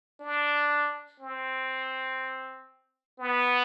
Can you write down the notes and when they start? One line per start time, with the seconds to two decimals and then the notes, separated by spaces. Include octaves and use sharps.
0.20 D4
1.20 C4
3.20 B3